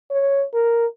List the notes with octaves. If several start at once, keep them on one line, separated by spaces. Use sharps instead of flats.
C#5
A#4